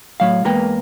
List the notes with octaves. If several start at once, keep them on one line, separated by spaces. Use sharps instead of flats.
A2 F#3 F5
E2 G#3 A#3 A#4 B4 G5